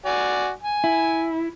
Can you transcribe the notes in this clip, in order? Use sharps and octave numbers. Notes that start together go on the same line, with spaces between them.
F#4 D5 G#5
G#5
E4